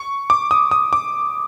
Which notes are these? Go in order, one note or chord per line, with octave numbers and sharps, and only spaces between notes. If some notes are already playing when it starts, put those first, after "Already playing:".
Already playing: C#6
D6
D#6
D#6
D6